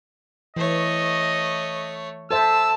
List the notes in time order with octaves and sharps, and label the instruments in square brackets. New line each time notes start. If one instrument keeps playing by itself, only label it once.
[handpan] E3 [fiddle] A3 C#5 [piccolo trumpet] D#5
[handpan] A4 C5 E5 [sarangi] A5 [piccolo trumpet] E6